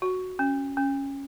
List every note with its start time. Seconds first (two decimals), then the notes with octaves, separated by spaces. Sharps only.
0.02 F#4
0.39 C#4
0.77 C#4